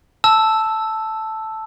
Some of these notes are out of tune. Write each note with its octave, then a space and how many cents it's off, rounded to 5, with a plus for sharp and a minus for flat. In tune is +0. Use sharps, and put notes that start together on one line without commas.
A5 +0 E6 +0